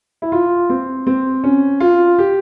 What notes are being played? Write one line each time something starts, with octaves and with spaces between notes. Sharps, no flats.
E4
F4
C4
C4
C#4
F4
G4